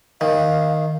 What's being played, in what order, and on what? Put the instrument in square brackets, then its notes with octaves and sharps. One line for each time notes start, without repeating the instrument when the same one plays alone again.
[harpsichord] D#3 [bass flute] F5